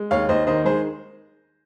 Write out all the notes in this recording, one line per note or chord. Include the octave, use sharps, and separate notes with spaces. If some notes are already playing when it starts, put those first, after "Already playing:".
Already playing: G#3
D#2 C#5 F5
D#2 C5 D#5
D#3 C5 D#5
G#3 G#4 C5